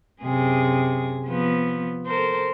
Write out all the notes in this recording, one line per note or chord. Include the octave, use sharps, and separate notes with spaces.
F#2 C3 G#4
F3 B3
A4 A#4 C5